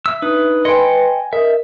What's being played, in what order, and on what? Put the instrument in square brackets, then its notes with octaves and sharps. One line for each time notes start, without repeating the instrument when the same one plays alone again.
[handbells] E5 B6 [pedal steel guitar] E6
[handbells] D4 D#4 D#6 [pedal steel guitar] B4
[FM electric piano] B4 C6 C#7 [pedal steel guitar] D#5 G5 [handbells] G#5 G#6
[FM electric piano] A#4 D#5 [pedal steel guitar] E5